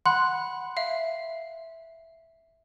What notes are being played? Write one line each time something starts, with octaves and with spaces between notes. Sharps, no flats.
F#5 B5 C6 F#6
E5 F5